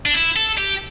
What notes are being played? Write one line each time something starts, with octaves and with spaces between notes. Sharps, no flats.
D4
E4
A4
G4